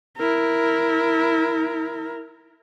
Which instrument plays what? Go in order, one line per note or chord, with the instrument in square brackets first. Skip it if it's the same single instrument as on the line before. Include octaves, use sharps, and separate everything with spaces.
[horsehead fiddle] E4 A#4